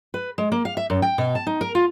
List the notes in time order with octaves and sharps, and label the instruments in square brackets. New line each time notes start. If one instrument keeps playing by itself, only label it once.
[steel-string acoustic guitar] B4
G#3
A#3
F5
E5
F#2
G5
B2
A5
D#4
A#4
F4